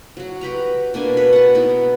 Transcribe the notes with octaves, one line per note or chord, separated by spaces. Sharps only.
F#3 F#4
F#4 G4 B4 A#5
B2 A#3 D4 G#5
B4 C#5
F#5 A5
B3 D#4 E4